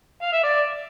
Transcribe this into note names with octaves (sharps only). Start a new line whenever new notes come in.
F5
E5
D5